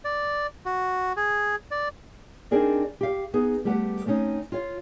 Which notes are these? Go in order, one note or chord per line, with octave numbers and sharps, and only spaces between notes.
D5
F#4
G#4
D5
C4 D4 D#4 G#4 A#4 D5
G4 F5
B3 D#4 G#4
G3 A3 G4 B4 F#5
A3 C4 C#4 D#4
F4 C#5 F5